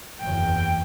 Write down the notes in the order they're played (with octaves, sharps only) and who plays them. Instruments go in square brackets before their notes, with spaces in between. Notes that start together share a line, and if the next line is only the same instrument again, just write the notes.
[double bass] F#1 E2 [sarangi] G5